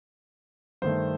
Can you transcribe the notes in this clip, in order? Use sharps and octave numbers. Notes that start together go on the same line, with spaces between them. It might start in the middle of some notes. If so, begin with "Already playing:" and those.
G2 D#3 A3 C5